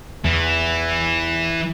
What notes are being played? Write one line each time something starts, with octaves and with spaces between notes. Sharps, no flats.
E2 E3